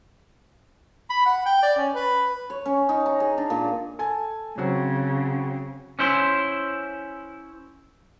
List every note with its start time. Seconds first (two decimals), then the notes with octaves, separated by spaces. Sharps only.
1.10 B5
1.26 F#5
1.45 G5
1.63 D5
1.77 C#4
1.95 B4
2.50 C#5
2.66 C#4
2.89 D#4
3.06 A#5
3.20 G#4
3.38 D4
3.50 A#2
3.99 A4 G#5
4.58 C#3 F#3 C4 F#4
5.99 C#4 E4 C5